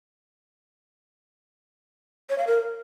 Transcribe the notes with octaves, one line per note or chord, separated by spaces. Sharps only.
C#5
F5
A#4